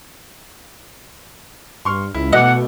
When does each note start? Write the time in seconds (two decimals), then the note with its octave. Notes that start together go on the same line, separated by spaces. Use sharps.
1.85 G2 C6 C#6 F6
2.14 C#2 E4
2.33 B2 E3 A3 D#5 F#5 D6